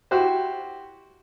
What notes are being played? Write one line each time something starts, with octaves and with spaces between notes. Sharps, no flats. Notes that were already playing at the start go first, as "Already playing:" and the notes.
E4 F#4 G4 C5